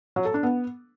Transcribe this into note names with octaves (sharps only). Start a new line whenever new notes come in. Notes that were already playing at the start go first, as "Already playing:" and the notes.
F#3
A4
D4
B3